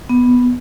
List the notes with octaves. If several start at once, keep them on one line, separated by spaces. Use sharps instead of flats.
B3